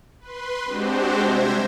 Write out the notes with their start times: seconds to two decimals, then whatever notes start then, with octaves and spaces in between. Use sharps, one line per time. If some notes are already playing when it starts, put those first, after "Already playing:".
0.20 B4 C6
0.64 G#3 C4 D4 F#4 G4 C5
1.23 C3 G3 C5 E5 G#6 A#6